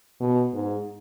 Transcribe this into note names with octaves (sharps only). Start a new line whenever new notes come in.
B2
G#2